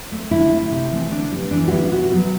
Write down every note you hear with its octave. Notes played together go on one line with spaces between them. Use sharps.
A3 C4
D3 E4
A3 C4
C3
E3 A3 C4
D3 D4
G3 B3
E3 D4
F#4
G3 B3 E4
B2 F#4
F#3 B3